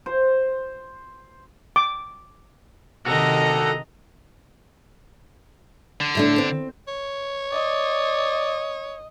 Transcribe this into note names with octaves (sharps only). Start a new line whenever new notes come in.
C5
D6
C3 D#3 F#4 A4 D#5 A#5
D3
A2 A3 D4
C4
C#5
D5 D#5